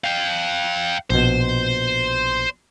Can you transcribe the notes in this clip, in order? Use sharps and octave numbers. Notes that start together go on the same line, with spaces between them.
F5 G5
A#1 B2 C5